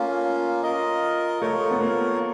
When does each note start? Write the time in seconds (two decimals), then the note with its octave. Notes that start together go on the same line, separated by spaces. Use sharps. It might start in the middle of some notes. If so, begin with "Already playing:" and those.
Already playing: A3 A#3 C#4 F4
0.63 F4 A#4 D#5
1.41 A3 F4 A#4 C#5
1.71 B3
1.81 A#3